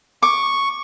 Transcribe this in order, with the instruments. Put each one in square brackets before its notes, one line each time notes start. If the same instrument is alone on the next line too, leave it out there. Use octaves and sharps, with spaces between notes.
[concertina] C#6 [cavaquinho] D6